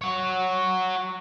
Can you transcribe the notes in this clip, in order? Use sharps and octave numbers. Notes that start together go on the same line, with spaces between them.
C#5 F#5